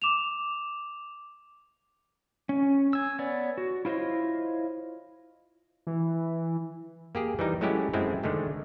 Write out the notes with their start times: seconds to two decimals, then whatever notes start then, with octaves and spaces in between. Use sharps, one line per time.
0.02 D6 E7 F7
2.49 C#4
2.93 G#5 E6
3.19 B3 C#5 D5
3.58 F#4
3.85 E4 F4 C5 C#5 D#5
5.87 E3
7.15 A#3 G4 G#4
7.39 E3 G3 D#4
7.61 F#3 G#3 A3 C#4 E4 G4
7.93 F#2 G#3 A3 C4 E4
8.23 D3 D#3 G#3 A3